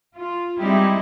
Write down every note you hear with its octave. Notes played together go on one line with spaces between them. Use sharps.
F4
G3 G#3 C4 D#4 E4 G4